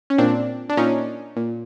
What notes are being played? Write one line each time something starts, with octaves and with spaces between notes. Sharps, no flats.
C#4
A#2 C4 D4
D4
A#2 C#4 D#4
A#2